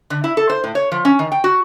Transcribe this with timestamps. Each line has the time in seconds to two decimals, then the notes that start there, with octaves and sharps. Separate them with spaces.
0.10 D3
0.24 E4
0.37 A4
0.50 C5
0.64 A2
0.75 C#5
0.92 F3
1.05 C#4
1.19 D#3
1.32 G5
1.44 F#4